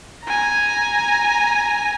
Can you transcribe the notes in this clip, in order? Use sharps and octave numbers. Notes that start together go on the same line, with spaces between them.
G#5 A#5